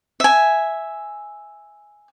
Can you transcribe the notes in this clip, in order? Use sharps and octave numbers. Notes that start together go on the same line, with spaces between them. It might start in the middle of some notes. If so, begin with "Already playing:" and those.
E5 G#5